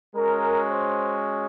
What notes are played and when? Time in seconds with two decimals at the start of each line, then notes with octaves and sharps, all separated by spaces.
0.16 G#3 C#4 F#4 A#4
0.68 C5